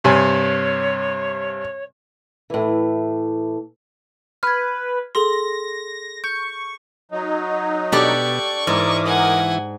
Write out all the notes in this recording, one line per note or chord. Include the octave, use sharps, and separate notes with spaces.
G2 C3 C#5 G#5
A2 E3
B4 F6 G#6
G#4 A4 C6 A#6
C#6 G6
F#3 D#4
B2 D4 G4 A4 D5 C#6
G#2 E3 A#4 D6 D#6
F#5 G#5